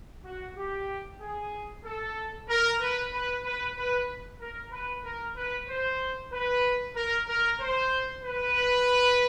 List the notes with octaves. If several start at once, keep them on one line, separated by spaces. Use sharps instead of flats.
F#4
G4
G#4
A4
A#4
B4
B4
B4
B4
A#4
B4
A#4
B4
C5
B4
A#4
A#4
C5
B4